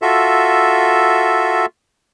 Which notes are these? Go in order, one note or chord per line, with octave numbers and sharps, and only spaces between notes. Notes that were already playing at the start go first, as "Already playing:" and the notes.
F4 F#4 A4 E5